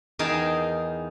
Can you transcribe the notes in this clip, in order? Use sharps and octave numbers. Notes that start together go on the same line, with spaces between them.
E2 D#4 G#4 A#4 G5 A5